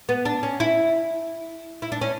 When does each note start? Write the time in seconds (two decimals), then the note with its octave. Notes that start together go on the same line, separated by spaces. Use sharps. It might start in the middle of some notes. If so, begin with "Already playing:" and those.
0.09 B3
0.25 D4
0.43 C#4
0.60 E4
1.82 E4
1.92 D4
2.01 C#4